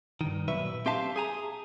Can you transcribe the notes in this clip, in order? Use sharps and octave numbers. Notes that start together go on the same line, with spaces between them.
G2 D#3
B1 A#2 F#3 B4 E5
C4 G4 E5 F5 A5 C6
G#4 G#5 A#5